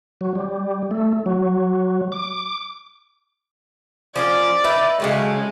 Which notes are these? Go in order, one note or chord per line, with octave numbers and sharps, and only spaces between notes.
F#3
G3
A3
F#3
D6
F3 C#4 A#4 D5
D#4 B4 E5
C#3 F#3 G#3 A3